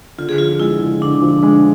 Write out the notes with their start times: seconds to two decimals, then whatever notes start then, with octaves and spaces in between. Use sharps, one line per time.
0.18 D3 F4
0.29 G#4
0.38 F3 F4
0.60 G#3 E4
0.80 D3
1.01 D3 D4
1.22 F3
1.43 G#3